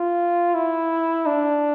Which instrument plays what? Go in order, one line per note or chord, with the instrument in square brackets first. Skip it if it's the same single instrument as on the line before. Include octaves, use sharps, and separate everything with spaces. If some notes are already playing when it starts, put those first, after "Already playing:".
Already playing: [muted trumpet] F4
E4
D4